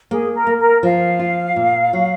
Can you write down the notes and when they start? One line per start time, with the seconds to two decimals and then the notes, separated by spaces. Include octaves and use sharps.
0.11 A#3 G#4
0.34 A#4
0.47 A#3
0.59 A#4
0.83 F3 F5
1.19 F4
1.56 A#2
1.93 F#3